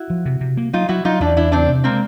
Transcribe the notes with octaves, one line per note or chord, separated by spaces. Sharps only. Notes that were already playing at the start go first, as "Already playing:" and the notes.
Already playing: E4 F#4
F3
C3
C3
A#3
F#3 D#4 F4
F#3 E4 F#4
F#3 D#4 F4
E2 D4 E4
E2 D4 E4
C#3 C4 D4
C3
G#3 A#3 C4